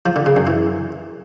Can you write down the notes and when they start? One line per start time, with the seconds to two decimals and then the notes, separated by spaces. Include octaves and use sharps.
0.06 F3
0.16 D3
0.26 C#3
0.36 F#2
0.47 E3